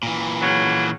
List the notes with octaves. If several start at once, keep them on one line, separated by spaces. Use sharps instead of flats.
A#2 E3
C#3 F#3